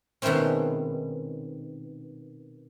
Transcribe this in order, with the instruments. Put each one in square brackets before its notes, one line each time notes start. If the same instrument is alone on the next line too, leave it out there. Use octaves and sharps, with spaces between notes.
[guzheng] B2 D#3 G#3 A3 C4 C#4